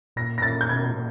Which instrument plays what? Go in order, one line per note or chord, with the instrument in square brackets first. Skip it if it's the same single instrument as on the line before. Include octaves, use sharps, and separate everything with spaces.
[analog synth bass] A#2 [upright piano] A#6
[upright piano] A#6
[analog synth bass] A#2 [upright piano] A6
[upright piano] G6
[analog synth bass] B2 [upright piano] G#6
[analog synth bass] A2
A#2